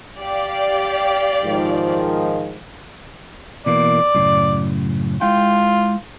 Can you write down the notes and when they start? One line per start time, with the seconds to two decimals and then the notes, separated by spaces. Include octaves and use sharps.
0.18 G4 D5 F5
1.44 G#2 D#3 F3
3.66 B2 E3 A#3 D5
4.15 F#2 A2 C#3
5.21 G#3 E4 F4 G5